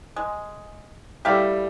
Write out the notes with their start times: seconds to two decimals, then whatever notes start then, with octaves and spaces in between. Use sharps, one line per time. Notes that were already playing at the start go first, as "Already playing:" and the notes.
0.16 G#3
1.25 G3 A3 E4 G4 E5 F5